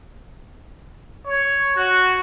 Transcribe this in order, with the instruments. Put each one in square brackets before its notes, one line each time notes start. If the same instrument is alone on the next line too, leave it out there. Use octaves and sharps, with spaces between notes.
[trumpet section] C#5
F#4